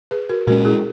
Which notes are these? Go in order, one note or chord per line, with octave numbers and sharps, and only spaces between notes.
G#4 B4
F#4 A#4
A#2 G#3 C#4 F#4 A#4
E4 G#4